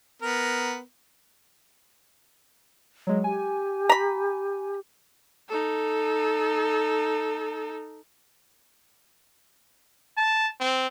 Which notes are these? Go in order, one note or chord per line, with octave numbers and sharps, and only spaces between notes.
B3 A#4
F#3 G#3
G4 G#5
A#5 B5
D#4 A4
A5
C4